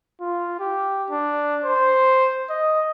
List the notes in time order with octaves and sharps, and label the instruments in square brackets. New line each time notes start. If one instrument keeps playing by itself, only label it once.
[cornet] F4
G4
D4
C5
D#5